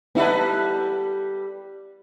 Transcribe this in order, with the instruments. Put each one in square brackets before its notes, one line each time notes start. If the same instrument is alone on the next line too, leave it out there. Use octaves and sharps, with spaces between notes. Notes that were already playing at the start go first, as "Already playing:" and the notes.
[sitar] G3 A4 B4 [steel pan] B3 D#4 E4